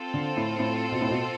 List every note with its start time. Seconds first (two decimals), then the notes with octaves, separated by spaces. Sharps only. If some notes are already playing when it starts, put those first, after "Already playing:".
Already playing: C4 F4 A4 C5
0.14 D3
0.37 A2
0.59 A2
0.92 B2
1.01 A2
1.10 B2